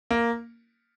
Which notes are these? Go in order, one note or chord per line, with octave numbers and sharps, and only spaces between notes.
A#3